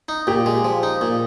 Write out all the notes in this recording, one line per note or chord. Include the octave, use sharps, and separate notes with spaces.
D#4
A#2 G4
G#3
F3
D#4
A#2